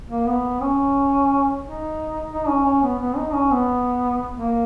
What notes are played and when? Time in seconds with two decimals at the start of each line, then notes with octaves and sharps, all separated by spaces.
0.10 A#3
0.27 B3
0.61 C#4
1.64 D#4
2.32 D#4
2.49 C#4
2.65 C#4
2.83 B3
3.00 B3
3.17 D#4
3.34 C#4
3.51 B3
4.36 A#3